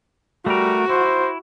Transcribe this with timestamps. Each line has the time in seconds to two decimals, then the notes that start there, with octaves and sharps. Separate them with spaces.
0.46 G3 A3 F#4 A#4
0.89 E4 C5